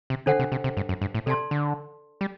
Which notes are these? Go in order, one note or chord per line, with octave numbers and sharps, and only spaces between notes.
C3
D3 D4 A4 C5 F#5
C3
C3
C3
G2
F#2
G2
A2
C3 A4 D5 A5 C6
D3
G3